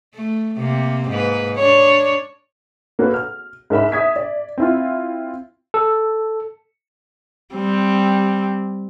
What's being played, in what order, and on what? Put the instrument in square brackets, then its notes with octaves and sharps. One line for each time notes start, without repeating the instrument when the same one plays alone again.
[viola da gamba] A3
C3 A#3 C4
G#2 A#3 B4
D4 C#5
[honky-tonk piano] A#3 F#4 A4 B4
F6
G#2 A#4 E5 B5
E5 D#6 G#6 B6
D5
C4 E4 F4
[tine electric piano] A4
[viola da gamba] G3 C4